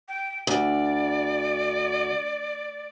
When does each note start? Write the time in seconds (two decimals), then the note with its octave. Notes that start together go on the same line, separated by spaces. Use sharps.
0.08 G5
0.47 D2 D5